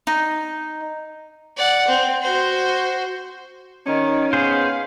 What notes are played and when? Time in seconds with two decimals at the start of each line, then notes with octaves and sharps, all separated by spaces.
0.07 D#4
1.57 D5 F#5
1.88 C4
2.21 F#4 C5
3.86 D#3 C#4
4.33 B3 G#4 C5 F5